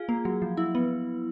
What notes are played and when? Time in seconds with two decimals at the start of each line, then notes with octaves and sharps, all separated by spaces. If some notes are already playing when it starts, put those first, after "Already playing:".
Already playing: F4 G#4
0.09 A#3
0.25 F#3
0.42 F3
0.57 E4
0.75 B3